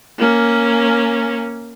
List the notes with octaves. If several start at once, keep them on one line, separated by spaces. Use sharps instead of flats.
A#3 C#4